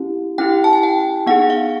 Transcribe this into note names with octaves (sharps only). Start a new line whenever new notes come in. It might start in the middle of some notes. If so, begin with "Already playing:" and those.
Already playing: C#4 E4 G4
C#4 E4 G4 G5
A5
G#5
G5
B3 D#4 G#4 F#5
F5